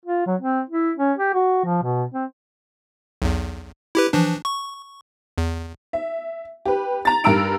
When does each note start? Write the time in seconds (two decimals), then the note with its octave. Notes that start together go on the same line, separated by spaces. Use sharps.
0.06 F4
0.26 F#3
0.41 C4
0.70 E4
0.97 C#4
1.18 G4
1.34 F#4
1.64 F3
1.83 B2
2.14 C4
3.22 B1 E2
3.95 E4 G4 B4
4.13 E3 F3 D4
4.45 C#6
5.38 E2
5.93 E5
6.66 G4 B4
7.05 A#5 A6
7.24 G2 A#4 A#5 E6 D7